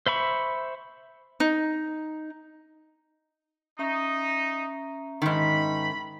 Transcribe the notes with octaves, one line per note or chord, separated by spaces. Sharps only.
C5 E5 B5 C#6
D#4
C#4 D#4 E5 A#5
G#2 D#3 B5